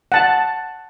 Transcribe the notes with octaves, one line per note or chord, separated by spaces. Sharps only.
F#5 A5